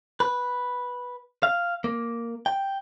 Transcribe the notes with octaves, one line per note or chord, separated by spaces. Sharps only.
B4
F5
A#3
G5